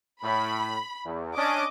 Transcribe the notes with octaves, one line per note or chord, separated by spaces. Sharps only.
A2 B5
E2
C#4 D4 D#5 D6